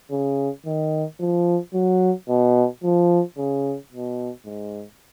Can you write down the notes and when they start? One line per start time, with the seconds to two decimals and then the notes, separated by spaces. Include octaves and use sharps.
0.11 C#3
0.66 D#3
1.20 F3
1.74 F#3
2.29 B2
2.83 F3
3.37 C#3
3.92 B2
4.46 G#2